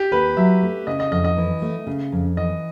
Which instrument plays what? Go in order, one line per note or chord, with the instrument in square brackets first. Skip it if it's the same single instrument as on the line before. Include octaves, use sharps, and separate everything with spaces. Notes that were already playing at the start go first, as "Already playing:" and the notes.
Already playing: [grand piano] G4
[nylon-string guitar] D#2 [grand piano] B4
[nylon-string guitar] F#3 [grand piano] E5
[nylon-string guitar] A3
[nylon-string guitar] C#3 [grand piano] D#5
[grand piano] D#5
[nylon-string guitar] F2 [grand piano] D#5
[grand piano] D#5
[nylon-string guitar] E3
A3
C#3
F2
[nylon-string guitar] E3 [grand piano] D#5